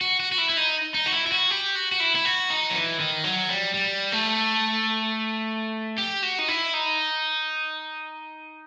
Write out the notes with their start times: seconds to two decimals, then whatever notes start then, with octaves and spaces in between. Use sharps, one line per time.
0.01 F#4
0.20 F#4
0.32 F#4
0.38 E4
0.49 E4
0.57 D#4
0.94 D#4
1.06 F#4
1.13 E4
1.26 E4
1.32 F#4
1.51 G4
1.75 F#4
1.92 F#4
2.00 E4
2.15 E4
2.25 F#4
2.50 D#4
2.70 F#3
2.75 E3
3.00 D#3
3.24 F#3
3.49 G3
3.74 G3
4.12 A3
5.98 G4
6.22 F#4
6.39 D#4
6.48 E4
6.73 D#4